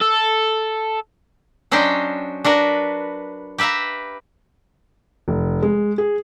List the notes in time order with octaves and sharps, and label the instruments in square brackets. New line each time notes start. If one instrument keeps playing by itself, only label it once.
[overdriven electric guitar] A4
[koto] F#3 C#4 D4 C5 D#5 G5
D4 F#4 A#4 B4
G4 B4 E5 F5 A#5
[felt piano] F1
G#3
G#4